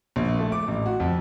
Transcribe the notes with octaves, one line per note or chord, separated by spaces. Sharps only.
A#1
A3
D6
A1
F#4
F2